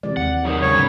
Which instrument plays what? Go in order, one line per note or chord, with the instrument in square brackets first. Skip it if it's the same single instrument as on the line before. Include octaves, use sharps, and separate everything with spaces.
[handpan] C3 E3 D5 [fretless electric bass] G#3
[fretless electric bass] D#2 [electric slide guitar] F#5
[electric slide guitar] F#3 G#4 C5 [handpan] D#4 A#4
[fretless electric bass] C#3 G#3 [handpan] C#4 [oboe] C#5
[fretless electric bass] G#2 C#3 [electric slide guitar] B3 E4